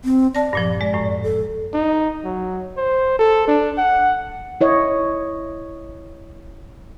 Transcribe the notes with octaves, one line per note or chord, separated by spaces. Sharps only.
C4
D5 A5 A#6
G2 A#2 F3
G#3
F#2 A2
A4
D#4
F#3
C5
A4
D4
F#5
E4 C#5 D#5